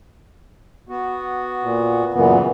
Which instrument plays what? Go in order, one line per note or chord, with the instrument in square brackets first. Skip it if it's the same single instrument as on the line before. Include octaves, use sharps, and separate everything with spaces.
[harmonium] B3 F#4
[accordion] A#2
[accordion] F#2 A#2 B3 [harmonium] C#3 E3